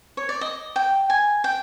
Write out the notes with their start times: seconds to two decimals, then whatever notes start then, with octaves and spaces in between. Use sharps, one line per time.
0.17 C#5
0.29 D5
0.41 D#5
0.76 G5
1.10 G#5
1.44 G5